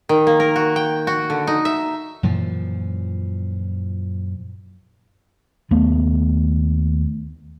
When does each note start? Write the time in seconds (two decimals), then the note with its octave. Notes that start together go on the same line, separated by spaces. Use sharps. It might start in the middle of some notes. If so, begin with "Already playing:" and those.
0.09 D#3
0.27 A#3
0.40 A#4
0.56 F#4
0.76 G5
1.07 F#4
1.30 D3
1.47 D#4
1.65 E5
2.23 F#2 A#2 E3 F3
5.71 D#2 A3 B3